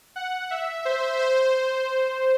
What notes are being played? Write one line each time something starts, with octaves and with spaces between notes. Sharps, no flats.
F#5
E5
C5
C5